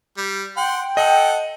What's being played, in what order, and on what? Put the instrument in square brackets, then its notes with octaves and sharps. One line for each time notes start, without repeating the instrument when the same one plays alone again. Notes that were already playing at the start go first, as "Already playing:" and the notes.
[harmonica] G3
[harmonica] F#5 C6 [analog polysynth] G5
[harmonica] A4 F#5 [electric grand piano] D#5